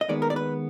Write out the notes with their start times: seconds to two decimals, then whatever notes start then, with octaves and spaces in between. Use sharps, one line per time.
0.01 D#5
0.08 D#2 D#3 G#3 B3 D5
0.22 A#4
0.30 D5
0.36 B4